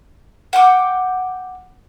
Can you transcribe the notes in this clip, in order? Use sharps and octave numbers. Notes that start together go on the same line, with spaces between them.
F#5 G5 D6